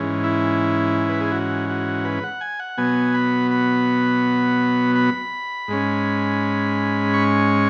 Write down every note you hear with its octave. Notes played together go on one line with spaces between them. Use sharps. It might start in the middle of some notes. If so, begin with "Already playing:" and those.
Already playing: G#2 E3 C#4
E4
B4
G#4
F#4
F#4
B4
F#5
G#5
F#5
B2 F#3 B3 G#5
B5
B5
B5
G#2 G#3 C#4
C#6